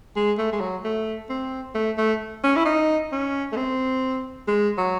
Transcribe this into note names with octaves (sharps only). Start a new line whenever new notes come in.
G#3
A3
G#3
F#3
A3
C4
A3
A3
C#4
E4
D#4
C#4
A3
C4
G#3
F#3